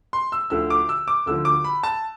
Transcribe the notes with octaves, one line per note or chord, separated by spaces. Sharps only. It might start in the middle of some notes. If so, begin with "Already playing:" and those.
C6
E6
D2 D3 F3 E6
D6
E6
D6
D2 D3 F3 E6
D6
B5
A5